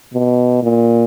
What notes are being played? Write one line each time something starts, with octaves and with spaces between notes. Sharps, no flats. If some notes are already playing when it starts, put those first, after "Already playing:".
B2
A#2